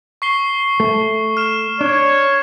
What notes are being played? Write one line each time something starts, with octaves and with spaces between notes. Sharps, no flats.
C#6 C7 G7
A3
F6 E7
D4 C#5